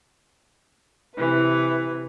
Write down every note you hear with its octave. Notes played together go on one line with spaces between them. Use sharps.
C3 E3 B4